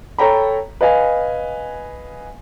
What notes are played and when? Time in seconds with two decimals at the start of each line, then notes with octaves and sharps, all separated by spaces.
0.18 A4 C#5 G5 A#5 B5
0.81 B4 D#5 F5 G#5